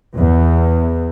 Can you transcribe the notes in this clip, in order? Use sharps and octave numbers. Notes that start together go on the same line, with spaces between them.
E2